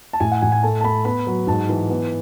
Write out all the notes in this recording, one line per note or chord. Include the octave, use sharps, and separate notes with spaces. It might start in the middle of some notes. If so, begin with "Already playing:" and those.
A5
A2 G#5
F#5
A2 G#5
G#5
A3 A5
A5
A3 B5
B3 B5
F#3
G#2 A5
E3
B3